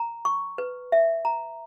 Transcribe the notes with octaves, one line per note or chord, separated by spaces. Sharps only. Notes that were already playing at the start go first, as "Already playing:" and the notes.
Already playing: A#5
C#6
B4
E5
A#5